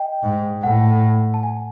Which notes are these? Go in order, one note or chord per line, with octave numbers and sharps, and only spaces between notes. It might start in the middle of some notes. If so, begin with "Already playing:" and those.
Already playing: D#5 G5
G#2
A2 F#5
A5
G#5